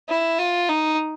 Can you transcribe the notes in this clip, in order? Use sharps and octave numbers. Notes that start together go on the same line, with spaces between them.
E4
F4
D#4